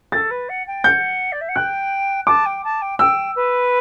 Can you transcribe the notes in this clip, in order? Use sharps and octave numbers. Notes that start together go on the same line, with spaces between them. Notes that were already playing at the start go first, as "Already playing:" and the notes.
A4 A6
B4
F#5
G5
F#5 G6
D5
E5
F#5
G5 F#6
A5 D6
G5
A5
G5
G5 E6
B4